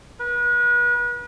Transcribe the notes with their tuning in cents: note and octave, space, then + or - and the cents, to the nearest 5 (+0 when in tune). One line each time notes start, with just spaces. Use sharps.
B4 -35